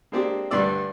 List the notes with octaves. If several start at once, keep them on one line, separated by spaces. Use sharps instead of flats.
G#3 A#3 C4 D4 G4
D2 G2 G3 D4 D5 E6